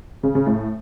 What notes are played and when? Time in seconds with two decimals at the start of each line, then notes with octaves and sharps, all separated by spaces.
0.23 C#3
0.35 C#3
0.47 A2